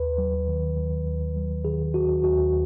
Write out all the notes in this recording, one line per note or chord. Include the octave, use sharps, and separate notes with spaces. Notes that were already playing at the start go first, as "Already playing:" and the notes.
Already playing: D#2 B4
F#3
D#3
D#2
D#2
F#3
D#3 G#4
D#2 F#4
D#2 F#4